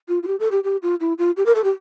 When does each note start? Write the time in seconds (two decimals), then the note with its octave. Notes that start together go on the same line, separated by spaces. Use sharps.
0.08 F4
0.23 F4
0.27 G4
0.40 A4
0.52 G4
0.64 G4
0.82 F4
1.00 E4
1.18 F4
1.37 G4
1.46 A#4
1.55 A4
1.64 G4